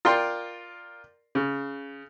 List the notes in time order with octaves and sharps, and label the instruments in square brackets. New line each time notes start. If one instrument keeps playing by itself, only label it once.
[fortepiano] F4 A#4 D5 G5 C6
C#3